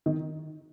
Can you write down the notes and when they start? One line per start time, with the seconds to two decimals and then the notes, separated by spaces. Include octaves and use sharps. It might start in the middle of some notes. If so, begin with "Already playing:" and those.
0.06 D#3